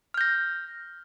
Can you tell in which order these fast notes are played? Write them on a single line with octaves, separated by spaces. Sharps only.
F6 G6 A#6